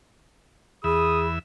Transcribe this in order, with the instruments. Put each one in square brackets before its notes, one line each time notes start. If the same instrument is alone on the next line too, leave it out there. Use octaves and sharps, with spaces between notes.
[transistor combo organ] E2 E5 [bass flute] G#4 [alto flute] B5 [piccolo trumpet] D#6